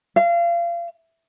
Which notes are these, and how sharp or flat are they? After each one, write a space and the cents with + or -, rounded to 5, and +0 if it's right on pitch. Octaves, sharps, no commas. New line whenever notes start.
F5 -30